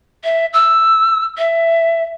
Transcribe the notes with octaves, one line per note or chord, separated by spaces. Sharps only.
E5
E6
E5